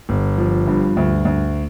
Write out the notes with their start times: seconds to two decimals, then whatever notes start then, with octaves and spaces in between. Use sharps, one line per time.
0.09 G1
0.38 F3
0.67 G2
0.97 D2
1.25 D2